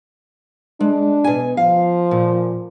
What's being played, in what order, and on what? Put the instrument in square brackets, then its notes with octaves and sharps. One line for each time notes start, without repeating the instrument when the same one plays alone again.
[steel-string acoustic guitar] G#3 [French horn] D4
[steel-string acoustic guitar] B2 G#5
[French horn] F3 [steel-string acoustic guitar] F5
[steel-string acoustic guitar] A#2